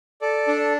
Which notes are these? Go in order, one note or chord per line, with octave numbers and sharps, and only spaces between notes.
A4 D5
D4